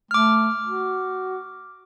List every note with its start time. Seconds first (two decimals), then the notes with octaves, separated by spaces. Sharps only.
0.11 A3 D6 F6
0.65 F#4